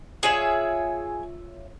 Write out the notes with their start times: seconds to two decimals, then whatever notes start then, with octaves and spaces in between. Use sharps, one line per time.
0.23 F4 G#4 C#5 E5